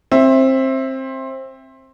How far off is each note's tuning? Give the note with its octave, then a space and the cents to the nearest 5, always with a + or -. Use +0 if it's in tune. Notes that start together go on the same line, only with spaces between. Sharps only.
C4 +20 E5 +0